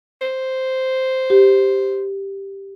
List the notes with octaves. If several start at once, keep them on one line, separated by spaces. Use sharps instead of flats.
C5
G4